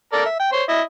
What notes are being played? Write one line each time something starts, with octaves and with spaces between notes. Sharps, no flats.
A4 A#4 D5
E5
G5
C5 C#5 C6
E4 D#5